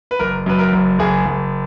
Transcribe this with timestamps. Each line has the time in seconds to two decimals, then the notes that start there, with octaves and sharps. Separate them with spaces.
0.11 B4
0.19 F#1 A#4
0.46 F#2 B4
0.59 A#4
0.72 F#1
0.99 F#1 G#4
1.25 F#1